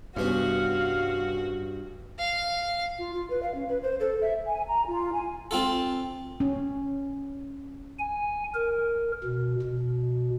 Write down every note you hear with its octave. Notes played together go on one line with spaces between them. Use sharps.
C2 G2 B3 C#4 F#4 F5
F5
F4
F4
B4
F5
C#4
B4
C5
A4
E5
G#5
A#5
F4
G#5
C4 F4 A4
C#4
G#5
A#4
B2
B2